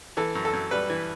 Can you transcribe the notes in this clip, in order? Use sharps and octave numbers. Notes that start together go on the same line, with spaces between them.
E3 A4
F#2
A4
F#2
G3 B4
E3